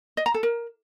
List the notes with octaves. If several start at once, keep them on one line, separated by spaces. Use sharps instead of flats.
D#5
A#5
A4
A#4